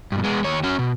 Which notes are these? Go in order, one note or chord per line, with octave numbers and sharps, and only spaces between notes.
G2 B2
G#3 B3
D#2 C#5
C#4 F#4
B2